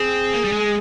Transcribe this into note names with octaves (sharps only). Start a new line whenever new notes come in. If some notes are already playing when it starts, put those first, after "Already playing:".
Already playing: C4 G#4
A#3
G3
G#3